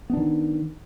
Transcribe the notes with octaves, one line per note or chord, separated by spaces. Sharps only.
D#3 B3 D4